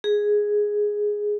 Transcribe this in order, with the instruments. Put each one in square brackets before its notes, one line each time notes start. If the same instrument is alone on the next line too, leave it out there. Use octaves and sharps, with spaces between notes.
[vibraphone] G#4